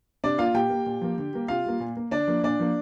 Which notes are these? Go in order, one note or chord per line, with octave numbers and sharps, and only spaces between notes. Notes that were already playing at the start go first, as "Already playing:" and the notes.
C3 D4 D5
A#3 F4 F5
A#2 G4 G5
A#3
A#2
F3 A#3
D3
G3 A#3
C3 F4 F5
G3 A#3
A#2
A#3
D3 D4 D5
F3 A#3
A#2 D4 D5
F3 A#3